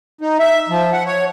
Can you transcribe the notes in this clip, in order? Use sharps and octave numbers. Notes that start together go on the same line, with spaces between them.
D#4
E5
F3
F#5
C#5